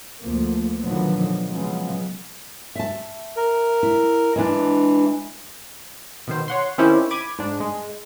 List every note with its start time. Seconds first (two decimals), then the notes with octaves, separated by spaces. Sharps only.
0.22 D2 F3 A#3
0.79 B2 D3 D#3 F3 F#3 B3
1.48 C#3 F3 F#3 G#3 B3
2.75 E5 A5
3.37 A#4
3.83 E4
4.36 E3 G#3 D4
6.27 B2 D#3 C5
6.48 C#5 F#5 C6
6.78 D#3 C4 C#4 E4 G4 C5
7.10 B5 D6 G#6 D#7
7.39 G#2 D4
7.60 G#3